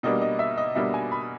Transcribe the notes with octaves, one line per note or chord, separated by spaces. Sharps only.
B2 G3 A#3 D4 D#5
D#5
E5
D#5
B2 G3 A#3 D4 E5
G#5
B5